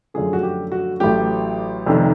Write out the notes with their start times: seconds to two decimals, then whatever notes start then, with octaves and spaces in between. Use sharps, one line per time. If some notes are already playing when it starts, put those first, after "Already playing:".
0.14 F#2 D3 F3 A3 G#4
0.33 F#4
0.43 G4
0.72 F#4
1.00 A1 A2 F#3 A3 G4
1.86 F1 F2 C3 D#3